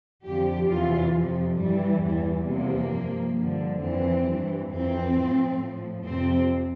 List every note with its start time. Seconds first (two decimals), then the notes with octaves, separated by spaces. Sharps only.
0.24 F2 D3 F3 G4
0.68 E2 C3 E3 F4
1.13 F2 C3 F3
1.58 G2 E3 G3
2.02 E2 E3 G3
2.47 E2 C3 F3 A#3
2.92 G2 F3
3.36 G2 D3 F3
3.82 F2 E3 C4
4.26 G2 E3
4.70 F2 E3 C4
5.15 A2 F3
5.60 A2 F3
6.05 F2 C3 F3 C4